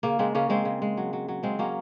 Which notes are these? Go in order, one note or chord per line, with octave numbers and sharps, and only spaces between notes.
C#3 A#3
C#3 G#3 C4
C#3 A#3 C#4
C#3 G#3 C4
C#3
G#3
F#3
F#3
F#3
C#3 G#3 C4
F#3 A#3 C#4